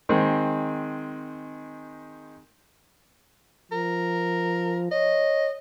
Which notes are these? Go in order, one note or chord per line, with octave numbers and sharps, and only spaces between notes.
D#3 G#3 C4
F3 A#4
C#5 D#5